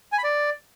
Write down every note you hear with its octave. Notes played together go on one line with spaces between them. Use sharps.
G#5
B5
D5